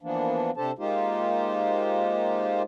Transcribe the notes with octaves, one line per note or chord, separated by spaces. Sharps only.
E3 F3 A#3 B3 D4
C3 D4 G4 A4 C5 A5
G#3 A#3 D#4 F4 G4 C5